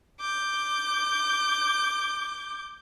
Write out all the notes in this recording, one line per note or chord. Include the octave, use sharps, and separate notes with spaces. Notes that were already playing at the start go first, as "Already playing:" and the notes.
D6 G6